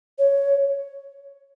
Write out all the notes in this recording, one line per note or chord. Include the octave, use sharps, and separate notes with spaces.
C#5